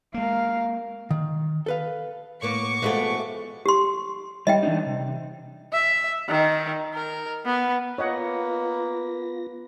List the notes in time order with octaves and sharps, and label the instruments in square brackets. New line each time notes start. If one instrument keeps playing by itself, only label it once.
[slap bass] G#3 A#3 [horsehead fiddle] A#4 F5
[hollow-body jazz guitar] D#3
A4 B4 F5
[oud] A2 A#3 B3 [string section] C#6 D6
[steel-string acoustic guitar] E3 F3 A3 [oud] G#3 B3 F#4
[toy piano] G4 C6
[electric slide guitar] G3 [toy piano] D#5 E5 G5
[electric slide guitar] E3 D4 D#4
C3
[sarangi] E5
D#3
A#4
B3
[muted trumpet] A#3 [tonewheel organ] B3 F4 A#6 [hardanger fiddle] B4 [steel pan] C#5 D#5 F#5